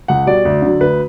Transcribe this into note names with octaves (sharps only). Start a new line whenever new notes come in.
C#2 F#5
B2 G3 D5
D2
D3 F#3
D2 B4